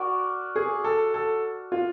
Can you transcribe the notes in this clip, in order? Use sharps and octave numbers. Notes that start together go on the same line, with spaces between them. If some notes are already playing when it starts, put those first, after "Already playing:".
Already playing: F#4 A#4 D5
G#4
A4
A4
F4